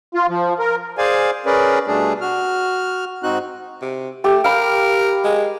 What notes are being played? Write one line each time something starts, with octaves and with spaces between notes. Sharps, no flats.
F4
F3
A#4
G#4 C5 D5 F5 G#5
C#4 G#4 A#4 B4 D5
B2 G3 A3 D4 G#4
F#4 F6
G#2 C4 D#4 F#4 F#6
C3
A3 G4
A#4 F5 B5
G#3